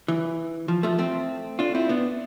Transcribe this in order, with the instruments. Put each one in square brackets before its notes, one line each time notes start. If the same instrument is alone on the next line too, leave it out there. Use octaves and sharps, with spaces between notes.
[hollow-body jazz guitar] E3
F3
F3 A3
A3 C4
D4 F4
C4 E4
B3 D4